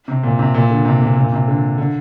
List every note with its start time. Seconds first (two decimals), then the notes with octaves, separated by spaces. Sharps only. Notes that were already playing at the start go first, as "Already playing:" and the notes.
0.08 C3
0.23 A#2
0.39 C3
0.54 A#2
0.70 D3
0.85 C3
1.01 A#2
1.16 A#2
1.32 C3
1.48 D3
1.78 D3